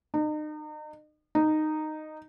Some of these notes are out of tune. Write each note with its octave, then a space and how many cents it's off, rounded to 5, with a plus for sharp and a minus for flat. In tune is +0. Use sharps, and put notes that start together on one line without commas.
D#4 -35
D#4 -10